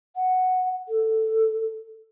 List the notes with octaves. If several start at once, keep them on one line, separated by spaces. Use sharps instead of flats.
F#5
A4